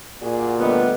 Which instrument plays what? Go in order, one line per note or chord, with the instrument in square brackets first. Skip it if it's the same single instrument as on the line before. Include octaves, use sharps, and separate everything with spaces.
[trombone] A#2 [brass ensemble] F#4 G#4 D5
[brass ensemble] F2 G3 A4 [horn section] D3 A3 B3 [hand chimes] B4 D#5